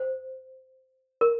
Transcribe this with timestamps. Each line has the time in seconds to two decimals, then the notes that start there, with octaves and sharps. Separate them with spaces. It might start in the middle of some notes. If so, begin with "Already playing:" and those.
Already playing: C5
1.21 A#4